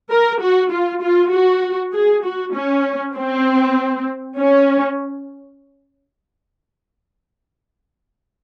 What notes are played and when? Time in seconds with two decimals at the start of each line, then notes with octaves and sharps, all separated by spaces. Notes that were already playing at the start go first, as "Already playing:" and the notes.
0.10 A#4
0.41 F#4
0.71 F4
1.02 F4
1.32 F#4
1.93 G#4
2.24 F#4
2.54 C#4
3.16 C4
4.38 C#4